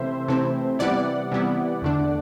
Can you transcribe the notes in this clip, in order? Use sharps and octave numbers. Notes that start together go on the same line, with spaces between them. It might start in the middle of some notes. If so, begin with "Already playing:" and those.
Already playing: C3 E3 A3 C4 E4 C5 E5
C3 E3 A3 C4 E4
C3 E3 G3 B3 E4 D5 F#5
C3 E3 G3 B3 E4
E2 D3 A3 D4